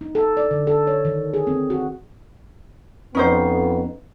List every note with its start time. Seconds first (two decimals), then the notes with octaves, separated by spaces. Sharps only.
0.01 D#4
0.15 A4
0.37 D5
0.51 D3
0.67 A4
0.87 C#5
1.05 D#3
1.34 G#4
1.47 C4
1.70 F#4
3.15 F2 B3 C#4 D#4 C5